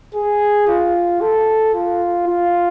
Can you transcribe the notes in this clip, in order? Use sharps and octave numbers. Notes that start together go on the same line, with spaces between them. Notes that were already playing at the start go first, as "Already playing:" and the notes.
G#4
F4
A4
F4
F4